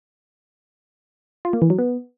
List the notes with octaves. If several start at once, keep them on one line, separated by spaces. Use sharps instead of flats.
F4
A#3
E3
F#3
B3